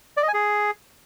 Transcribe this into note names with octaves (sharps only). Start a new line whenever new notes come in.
D5
D#5
G#5
G#4